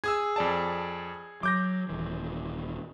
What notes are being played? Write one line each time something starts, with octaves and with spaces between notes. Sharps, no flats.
G#4 D#6 E6 G#6
F2 D5 A5
F#3 D6 G6 A#6
D#1 E3